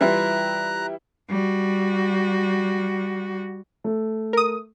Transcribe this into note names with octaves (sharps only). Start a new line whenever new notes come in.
E3 G3 E4 F4 A#5 F#6
G3 F#4
A3
A#4 D#6